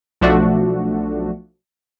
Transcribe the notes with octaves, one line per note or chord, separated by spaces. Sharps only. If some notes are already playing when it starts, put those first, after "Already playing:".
B1 F3 A3 D4 F#4